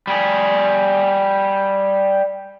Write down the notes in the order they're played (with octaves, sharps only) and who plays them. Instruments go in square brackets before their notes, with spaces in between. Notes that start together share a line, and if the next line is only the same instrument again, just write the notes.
[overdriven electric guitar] G3 G#4